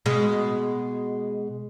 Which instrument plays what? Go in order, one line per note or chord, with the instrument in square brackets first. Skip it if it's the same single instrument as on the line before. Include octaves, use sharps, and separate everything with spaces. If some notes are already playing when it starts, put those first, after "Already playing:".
[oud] B2 G#3